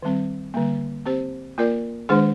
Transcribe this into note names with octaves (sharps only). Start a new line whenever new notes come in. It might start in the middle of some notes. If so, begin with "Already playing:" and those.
D#3 G3 C4
D3 G3 A#3
C4 G4 C5
A#3 F4 A#4 D5
D#3 G#3 D4 G#4 C5